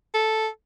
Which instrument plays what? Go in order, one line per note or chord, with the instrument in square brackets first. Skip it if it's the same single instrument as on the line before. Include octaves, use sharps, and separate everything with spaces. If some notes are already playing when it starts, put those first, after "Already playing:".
[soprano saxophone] A4